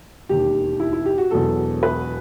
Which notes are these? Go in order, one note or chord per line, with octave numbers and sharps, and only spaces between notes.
E1 D#2 D#3 G4
E4
E4
G4
F#4
E1 E2 B2 F#3 A4
B4